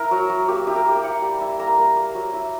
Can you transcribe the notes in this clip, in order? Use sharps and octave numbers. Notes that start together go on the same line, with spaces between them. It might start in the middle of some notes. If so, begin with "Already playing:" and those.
Already playing: E4 A#4
F#3
F#3
A#3 G4
E4 G4
A#4
A#3
G5
E4 F#5
G3
E4
A#3 A#5
A#3
A#3
F#3
E4